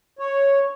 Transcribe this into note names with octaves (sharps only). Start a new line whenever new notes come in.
C#5